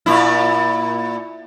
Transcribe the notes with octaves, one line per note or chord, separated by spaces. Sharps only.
A#2 E4